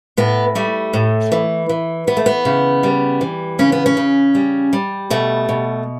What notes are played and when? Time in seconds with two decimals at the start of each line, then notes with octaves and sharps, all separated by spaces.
0.17 A2 B3
0.55 G3 A3
0.93 A2
1.32 E3
1.69 E3
2.07 E3 B3
2.17 A3
2.26 B3
2.45 C#3
2.83 G3
3.21 E3
3.59 C#3 C#4
3.72 B3
3.86 C#4
3.97 C#3
4.35 G3
4.73 G3
5.10 B2 A3
5.49 B2